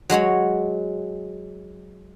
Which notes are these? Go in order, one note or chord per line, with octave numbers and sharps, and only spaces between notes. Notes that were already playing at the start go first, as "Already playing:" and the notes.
F#3 G#3 F#4 C#5